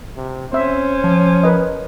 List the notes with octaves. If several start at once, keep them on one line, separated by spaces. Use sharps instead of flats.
C3
C4 C#4 C5 E5
F3
A#4 B4 D#5